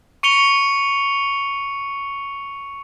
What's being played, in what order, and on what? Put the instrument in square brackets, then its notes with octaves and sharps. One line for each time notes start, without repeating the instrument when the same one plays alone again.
[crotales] C#6 C#7 F7 G7